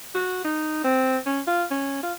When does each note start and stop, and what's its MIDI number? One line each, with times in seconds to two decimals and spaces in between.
0.15 0.41 66
0.44 0.79 63
0.84 1.18 60
1.26 1.40 61
1.47 1.64 65
1.71 2.03 61
2.03 2.13 65